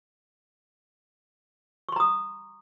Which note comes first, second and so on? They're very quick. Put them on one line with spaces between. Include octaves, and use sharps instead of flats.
C#6 C6 A#5 D#6